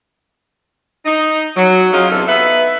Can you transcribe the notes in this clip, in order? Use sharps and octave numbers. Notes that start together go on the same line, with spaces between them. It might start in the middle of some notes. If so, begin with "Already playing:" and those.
D#4
F#3
C#4 D#4 F4 F#4 G#4
E2 C3 A4
B3 D#4 B4 E5